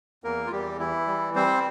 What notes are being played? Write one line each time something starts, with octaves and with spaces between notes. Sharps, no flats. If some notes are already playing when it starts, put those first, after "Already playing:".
E2 A#3 A#4
F4
E2 G3 G4
E3 E4
G3
G3 C4 C5